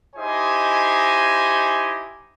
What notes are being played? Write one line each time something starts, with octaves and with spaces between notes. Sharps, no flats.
D#4 E4 G4 C5 D#5 G#5